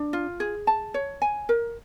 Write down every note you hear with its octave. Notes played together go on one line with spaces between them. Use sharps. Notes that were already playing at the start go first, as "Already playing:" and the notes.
Already playing: D4
F4
G#4
A5
C#5
G#5
A#4